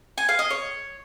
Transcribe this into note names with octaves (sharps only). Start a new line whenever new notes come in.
G#5
F5
D#5
C#5